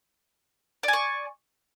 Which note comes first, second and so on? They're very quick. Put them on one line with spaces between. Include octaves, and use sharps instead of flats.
D5 G#5 C#6